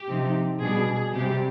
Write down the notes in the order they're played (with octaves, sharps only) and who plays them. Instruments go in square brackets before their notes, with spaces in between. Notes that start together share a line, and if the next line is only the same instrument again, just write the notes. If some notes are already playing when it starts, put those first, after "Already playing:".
Already playing: [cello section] G4
C3 F3 C4 D#4
B2 G3 D4 G#4
C3 G3 C4 G4